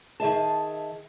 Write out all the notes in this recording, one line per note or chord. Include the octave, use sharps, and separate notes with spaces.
D#3 G#4 E5 A5